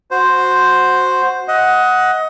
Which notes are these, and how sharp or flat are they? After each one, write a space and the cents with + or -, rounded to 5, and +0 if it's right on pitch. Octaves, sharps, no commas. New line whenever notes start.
F#4 -10 C5 +0
D#5 +20 F#5 +0